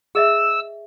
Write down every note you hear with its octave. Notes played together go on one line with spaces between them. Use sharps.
G#4 D#5 E5 E6